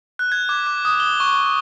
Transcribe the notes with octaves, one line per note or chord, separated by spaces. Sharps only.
F#6
G#6
D6
D6
D#6
G7
C#6